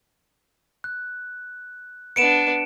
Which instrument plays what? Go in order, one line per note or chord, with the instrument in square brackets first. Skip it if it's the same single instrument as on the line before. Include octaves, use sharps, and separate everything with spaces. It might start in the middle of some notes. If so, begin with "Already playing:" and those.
[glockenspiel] F#6
[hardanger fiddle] B3 D4 [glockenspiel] C#7 D7 E7